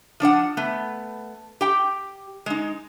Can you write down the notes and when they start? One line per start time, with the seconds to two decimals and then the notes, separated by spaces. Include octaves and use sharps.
0.20 F3 D4 C#5 F#5
0.57 A3 B3
1.61 G4 G5
2.46 G#3 D#4